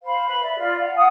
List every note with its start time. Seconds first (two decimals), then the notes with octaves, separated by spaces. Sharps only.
0.04 C5 F5 B5
0.26 B4 B5
0.43 D5 E5
0.58 F4 D5
0.78 F5 F#5
0.96 F5 F#5 G#5 D#6